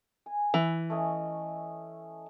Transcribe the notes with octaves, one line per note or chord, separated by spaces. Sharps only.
G#5
E3
A3 C#4 D#5